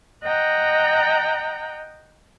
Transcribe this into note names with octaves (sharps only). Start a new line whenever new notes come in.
D#5 F#5 G5 A#5